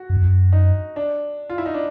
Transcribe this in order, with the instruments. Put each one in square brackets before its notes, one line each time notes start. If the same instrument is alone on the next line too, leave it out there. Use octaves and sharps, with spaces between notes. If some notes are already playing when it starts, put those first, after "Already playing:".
Already playing: [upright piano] F#4
[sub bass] F#2
F2
F#2
[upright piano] D#4
D4
F4
E4
D#4
D4